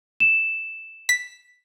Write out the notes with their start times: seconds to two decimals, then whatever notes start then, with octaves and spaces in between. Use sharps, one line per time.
0.20 E7
1.09 B6